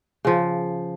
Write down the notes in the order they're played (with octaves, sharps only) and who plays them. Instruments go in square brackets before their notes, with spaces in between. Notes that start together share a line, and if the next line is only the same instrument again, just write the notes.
[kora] C#3 F3